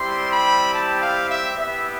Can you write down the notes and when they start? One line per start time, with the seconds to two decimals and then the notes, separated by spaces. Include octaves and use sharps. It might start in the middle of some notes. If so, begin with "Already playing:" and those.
Already playing: G3 C4 E4 G4 C6
0.29 B5
0.72 A5
1.00 F5
1.27 E5
1.56 B3 E4 G4 E5